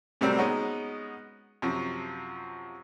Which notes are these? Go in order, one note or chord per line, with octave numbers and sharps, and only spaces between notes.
A2 C3 F#3 G3 A#3 C4
G#3 B3 C#4 D#4 F#4
F#2 C3 F3